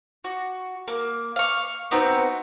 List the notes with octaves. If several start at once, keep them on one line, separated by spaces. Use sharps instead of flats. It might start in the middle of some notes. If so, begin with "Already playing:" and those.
F#4
A#3
F5 C#6
B3 C4 D#4 F#4